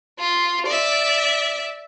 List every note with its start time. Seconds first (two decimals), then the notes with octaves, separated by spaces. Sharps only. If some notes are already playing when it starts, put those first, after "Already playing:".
0.19 F4
0.66 D5 E5